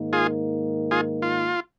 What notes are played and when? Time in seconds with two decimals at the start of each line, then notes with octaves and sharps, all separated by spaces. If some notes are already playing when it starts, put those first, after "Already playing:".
Already playing: G#2 D#3 A#3
0.13 F4 G#4
0.91 F4 G#4
1.22 F4